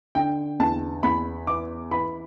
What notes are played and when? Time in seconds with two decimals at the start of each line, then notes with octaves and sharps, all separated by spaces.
0.15 D3 G5
0.60 E2 A5
1.03 E2 B5
1.47 E3 D6
1.91 E3 B5